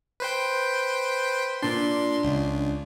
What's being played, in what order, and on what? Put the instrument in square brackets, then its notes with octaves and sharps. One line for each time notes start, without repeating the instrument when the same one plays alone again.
[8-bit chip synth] B4 C5 G5
[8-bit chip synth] A#2 C6 [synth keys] D4
[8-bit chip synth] C#2